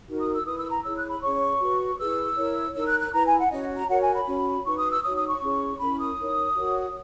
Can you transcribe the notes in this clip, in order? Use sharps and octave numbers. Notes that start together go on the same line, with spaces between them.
D#4 F#4 A#4
D#6
E6
E4 B4 D#6
E6
A#5
E4 G#4 C#5 E6
F#6
B5
C#4 G#4 C#5 C#6
F#4 B4
E4 G#4 B4 E6
E4 A#4 C#5
D#4 A#4 C#5 E6
F#6
F#6
E4 B4 A#5
G#5
F#5
C#4 F#4 C#5 D#5
A#5
F#4 A#4 C#5 F#5
G#5
B5
C#4 F#4 C#5
D#4 F#4 B4 C#6
D#6
E6
D#4 F#4 C#5 D#6
D#6
C#6
C#4 E4 G#4 C#5
C#4 E4 A#4 B5
D#6
D#4 A#4 C#5
F#4 A#4 C#5